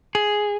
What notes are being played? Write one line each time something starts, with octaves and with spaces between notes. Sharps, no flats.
G#4